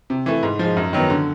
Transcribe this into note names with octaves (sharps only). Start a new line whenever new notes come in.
C3
E3 A3
G#2
F3 G#3
F#2
D#3 F#3 B3
D3